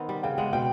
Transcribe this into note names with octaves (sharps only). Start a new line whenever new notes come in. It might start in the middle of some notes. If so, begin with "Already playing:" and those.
Already playing: D#3 B3 C4
G3
C#3 G5
G#3 F#5
B2 G5